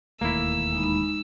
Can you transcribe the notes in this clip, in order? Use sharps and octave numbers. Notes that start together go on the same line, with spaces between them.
E1 D#2 A3 A#3 E4 E6
G#3 D#4 B5